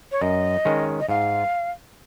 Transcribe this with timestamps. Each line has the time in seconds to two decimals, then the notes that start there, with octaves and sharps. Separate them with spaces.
0.11 C#5
0.22 F#2 D#5
0.65 D#3 G#3 C#4
1.00 D#5
1.09 G#2 F5